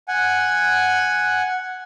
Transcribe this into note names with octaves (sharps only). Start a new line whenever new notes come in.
F#5 G#5